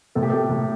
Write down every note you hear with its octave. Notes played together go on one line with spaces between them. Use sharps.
A2 A4
G4
A3 A4
A2